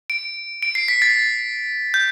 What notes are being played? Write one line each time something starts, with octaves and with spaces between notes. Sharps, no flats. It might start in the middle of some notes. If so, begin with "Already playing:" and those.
D7
D7
C7
B6
A6
G6